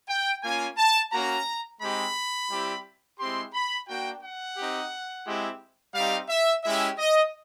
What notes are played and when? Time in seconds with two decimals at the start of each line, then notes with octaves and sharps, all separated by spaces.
0.09 G5
0.43 A#3 C#4 F4 G#5
0.78 A5
1.13 A#3 C#4 F#4 A#5
1.81 G#3 C4 D#4 G4 B5
2.50 G3 C4 E4 G4
3.19 G#3 C4 E4 G4 C6
3.54 B5
3.88 A#3 D4 F#4 G5
4.23 F#5
4.57 C4 D#4 G4
5.26 G#3 C4 E4 G4
5.95 G3 C4 D#4 G4 F5
6.29 E5
6.64 G#3 C#4 E4 G4 E5
6.98 D#5